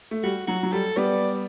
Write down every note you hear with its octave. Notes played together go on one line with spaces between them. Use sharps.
A3
G3 F#4
F#3 F#4
F#3
G3 A4
G3 B3 D5